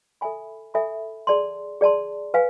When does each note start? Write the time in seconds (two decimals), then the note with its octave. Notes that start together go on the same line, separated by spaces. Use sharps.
0.21 A4 E5 G#5 B5
0.74 A4 E5 G#5 B5
1.27 G#4 D5 A5 C6
1.81 G#4 D5 A5 C6
2.34 B4 F5 G#5